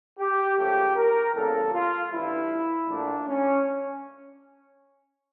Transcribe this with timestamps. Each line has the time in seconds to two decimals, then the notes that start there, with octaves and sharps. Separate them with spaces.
0.19 G4
0.57 C#2 C#3 F3 A3 G4
0.96 A#4
1.34 E2 C#3 G3 A#3 A4
1.72 F4
2.11 A1 G2 F3 E4
2.87 A#1 A#2 F3 A3 D4
3.26 C#4